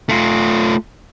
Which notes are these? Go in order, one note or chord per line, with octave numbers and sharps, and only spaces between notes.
A3 F4